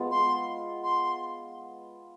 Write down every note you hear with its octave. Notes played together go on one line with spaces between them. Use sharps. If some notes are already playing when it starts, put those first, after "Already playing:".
Already playing: G#3 B3 F4
C6
C6